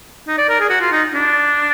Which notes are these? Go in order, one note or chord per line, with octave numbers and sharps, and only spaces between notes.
D#4
D5
A#4
G#4
F#4
F4
D#4
D4